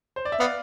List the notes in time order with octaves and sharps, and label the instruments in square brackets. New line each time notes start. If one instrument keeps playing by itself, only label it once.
[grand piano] C5
D5
E5
[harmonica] B3 [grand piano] D5 F5